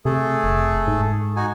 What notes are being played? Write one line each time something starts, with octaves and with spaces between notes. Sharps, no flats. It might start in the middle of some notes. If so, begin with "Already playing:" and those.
C3 A3 G#4 A4
F1
G#2
D#4 F#4 G#5